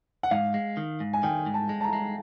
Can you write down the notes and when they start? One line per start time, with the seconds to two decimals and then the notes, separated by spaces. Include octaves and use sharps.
0.23 F#5
0.31 G#2 F5
0.54 G#3
0.77 D#3
1.00 G#2
1.13 G#5
1.23 D#3 G5
1.46 G#2
1.54 A5
1.69 G#3
1.81 A5
1.84 A#5
1.93 G#3